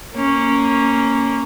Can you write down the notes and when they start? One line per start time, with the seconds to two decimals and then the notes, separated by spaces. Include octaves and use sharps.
0.14 A#3 C#4